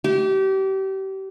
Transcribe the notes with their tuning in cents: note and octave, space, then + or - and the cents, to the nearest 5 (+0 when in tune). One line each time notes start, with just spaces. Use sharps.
G4 -30